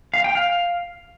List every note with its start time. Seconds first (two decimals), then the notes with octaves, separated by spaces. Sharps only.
0.14 F5
0.24 G5
0.35 F5